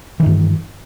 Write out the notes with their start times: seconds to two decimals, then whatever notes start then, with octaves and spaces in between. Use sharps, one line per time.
0.20 E3
0.23 D#3
0.26 G2